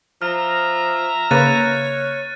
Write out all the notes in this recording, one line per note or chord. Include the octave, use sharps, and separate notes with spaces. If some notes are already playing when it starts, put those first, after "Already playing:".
F3 E5 A#5 F6
C#3 A#3 B4 C#5 F#6 A6 D#7